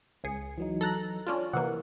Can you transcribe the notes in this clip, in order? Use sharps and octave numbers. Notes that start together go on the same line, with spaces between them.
C#2 G#4 C#7
E3 F#3 D#4
A4 A#5 F#6
C#4 D4 F4
C3 E3 A#3 F#5